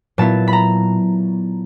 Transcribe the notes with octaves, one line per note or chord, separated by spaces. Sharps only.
A#2 F#3 B3 E4 A5
B5
A#5